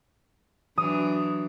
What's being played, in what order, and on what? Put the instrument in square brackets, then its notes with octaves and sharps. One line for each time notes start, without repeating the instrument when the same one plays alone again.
[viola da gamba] E3 F#3 D4 [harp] D#6